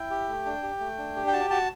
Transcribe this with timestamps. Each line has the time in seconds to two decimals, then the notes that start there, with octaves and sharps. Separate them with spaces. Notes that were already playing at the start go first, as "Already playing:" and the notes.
Already playing: E4 G5
0.10 G4
0.29 A3
0.46 D4
0.63 G4
0.80 A3
0.98 D4
1.16 G4
1.27 G5
1.33 F#4 A5
1.50 F#4 A5